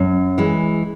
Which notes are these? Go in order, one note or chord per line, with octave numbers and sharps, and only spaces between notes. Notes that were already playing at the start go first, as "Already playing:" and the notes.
Already playing: F#2
E3 G#3